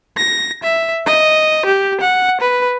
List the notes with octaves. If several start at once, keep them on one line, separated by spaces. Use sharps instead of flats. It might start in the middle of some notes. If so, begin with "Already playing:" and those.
A#6
E5
D#5
G4
F#5
B4